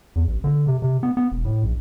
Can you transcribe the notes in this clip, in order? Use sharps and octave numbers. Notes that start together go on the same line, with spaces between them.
E2
A1
D3
C3
C3
B3
B3
E1
A2
A#1